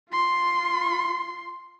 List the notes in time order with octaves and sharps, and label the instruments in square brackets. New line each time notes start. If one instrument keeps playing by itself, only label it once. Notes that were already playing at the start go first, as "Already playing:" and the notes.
[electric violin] F4 C6